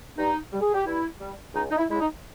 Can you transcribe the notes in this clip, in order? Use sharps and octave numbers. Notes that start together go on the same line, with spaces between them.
G2 D#4
G3
G#4
G4
G2 E4
G3
C#2 D#4
D#4
E4
C#3 G#3 E4
D#4